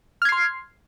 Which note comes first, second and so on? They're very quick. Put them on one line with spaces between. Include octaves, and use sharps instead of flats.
F6 G#6 C7 C6